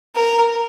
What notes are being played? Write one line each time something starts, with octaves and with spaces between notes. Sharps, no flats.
A#4